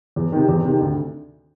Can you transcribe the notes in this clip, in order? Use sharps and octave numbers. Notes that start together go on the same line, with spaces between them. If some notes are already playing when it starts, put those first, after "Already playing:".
E2
C3 D#3
E2
C3 D#3
D2